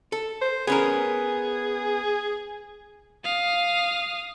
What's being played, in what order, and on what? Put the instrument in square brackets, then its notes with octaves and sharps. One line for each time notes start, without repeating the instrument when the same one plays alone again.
[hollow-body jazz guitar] A4
[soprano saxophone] C5
[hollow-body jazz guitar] B3 C#4 A#4 [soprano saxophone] G#4
[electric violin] F5 D#6